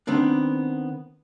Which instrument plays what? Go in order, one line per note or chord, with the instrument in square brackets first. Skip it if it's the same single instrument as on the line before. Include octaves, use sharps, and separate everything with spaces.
[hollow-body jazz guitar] D#3 B3 C4 D4